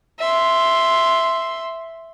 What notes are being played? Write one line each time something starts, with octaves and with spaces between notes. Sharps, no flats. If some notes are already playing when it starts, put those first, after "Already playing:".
E5 C6